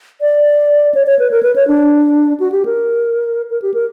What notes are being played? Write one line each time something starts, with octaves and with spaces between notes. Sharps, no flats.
D5
C#5
C#5
B4
A#4
B4
C#5
D4
F#4
G4
A#4
A#4
G4
A#4